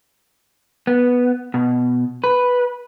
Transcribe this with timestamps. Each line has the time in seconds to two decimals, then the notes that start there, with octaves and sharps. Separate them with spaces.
0.87 B3
1.54 B2
2.24 B4